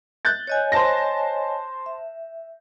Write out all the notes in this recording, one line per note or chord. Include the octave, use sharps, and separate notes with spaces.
F#6 G6 A6
C#5 D#5 G#5
C5 A5 A#6
E5